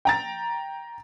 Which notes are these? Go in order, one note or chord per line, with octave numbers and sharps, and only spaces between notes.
G5 A#5 A6